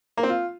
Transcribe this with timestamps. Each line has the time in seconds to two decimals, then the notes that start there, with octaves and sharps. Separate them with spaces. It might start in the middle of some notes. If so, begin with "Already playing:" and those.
0.17 A#3
0.23 C4
0.29 F4